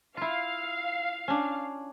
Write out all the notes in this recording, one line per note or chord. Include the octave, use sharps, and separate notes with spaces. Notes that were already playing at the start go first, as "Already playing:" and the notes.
E4 F4 F5
C#4 D4